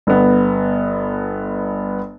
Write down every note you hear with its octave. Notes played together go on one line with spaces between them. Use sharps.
G1 B3